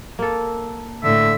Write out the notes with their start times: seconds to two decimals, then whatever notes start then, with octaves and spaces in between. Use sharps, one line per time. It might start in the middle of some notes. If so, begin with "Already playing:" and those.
0.19 A#3 A4
1.04 A2 D3 E5